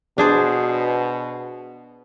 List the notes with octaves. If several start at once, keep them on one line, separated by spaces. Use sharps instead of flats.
B2 D4 G#4 C5